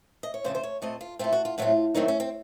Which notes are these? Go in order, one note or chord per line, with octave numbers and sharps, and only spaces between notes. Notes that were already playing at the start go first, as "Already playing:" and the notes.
D#5
C#5
F2 C#3 A3 C5
C5
C#5
A#2 A3 C4 D#5
F4
A#2 A3 C4 F4
F#4
F4
A2 F#3 A3 C4 F4
F2 D#3 F#3 A3 C4 D#4
C#4
C4